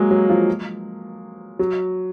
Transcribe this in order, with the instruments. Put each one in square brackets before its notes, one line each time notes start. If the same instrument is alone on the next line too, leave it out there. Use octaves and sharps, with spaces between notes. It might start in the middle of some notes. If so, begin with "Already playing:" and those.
Already playing: [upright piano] F#3 G#3 A#3
F#3
F3
F#3